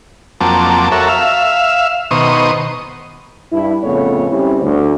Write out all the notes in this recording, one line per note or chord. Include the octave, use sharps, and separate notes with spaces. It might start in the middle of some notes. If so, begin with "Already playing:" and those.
F2 F#3 A#3 C4 A5 D6
F#4 A4 A#4 C#5 E5
E5 F5
B2 D#3 C5 C#6 D#6
G2 E4
F2 A2 C#3 A3 B3 C#5
G3 C4 C#4 E4 D5
D2